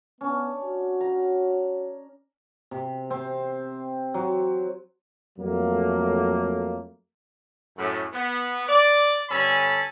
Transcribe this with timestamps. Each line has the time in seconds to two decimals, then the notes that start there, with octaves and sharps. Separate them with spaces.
0.21 B3 C#4 D4
0.63 F#4
1.01 A#5
2.71 C3
3.10 C4
4.14 F#3
5.38 F2 F#3 A3 A#3
7.78 F#2 A2 A3
8.13 B3
8.68 D5
9.30 G2 D3 C#4 A4 G#5 B5